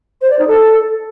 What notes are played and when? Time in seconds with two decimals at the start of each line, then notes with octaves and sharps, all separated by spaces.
0.22 C5
0.30 D5
0.39 D#4
0.47 A4